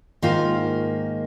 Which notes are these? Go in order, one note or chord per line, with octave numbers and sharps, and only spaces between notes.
G#2 D#3 A#3 F4